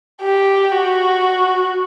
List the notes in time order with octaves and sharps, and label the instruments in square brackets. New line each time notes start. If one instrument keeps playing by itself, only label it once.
[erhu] G4
F#4